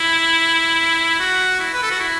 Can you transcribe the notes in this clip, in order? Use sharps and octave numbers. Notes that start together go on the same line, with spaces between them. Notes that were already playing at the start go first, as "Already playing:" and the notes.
Already playing: E4
F#4
E4
B4
A4
F#4
E4